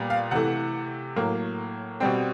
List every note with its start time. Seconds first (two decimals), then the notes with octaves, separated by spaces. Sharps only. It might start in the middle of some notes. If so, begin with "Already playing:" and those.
Already playing: A#2 G3 B3
0.10 F5
0.31 C3 E3 A3 F#5
1.16 A2 F#3 A#3
2.00 B2 G3 C4 G5